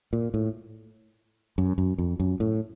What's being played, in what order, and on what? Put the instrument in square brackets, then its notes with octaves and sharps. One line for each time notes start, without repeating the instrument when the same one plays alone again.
[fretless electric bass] A#2
A2
F#2
F#2
F2
F#2
A2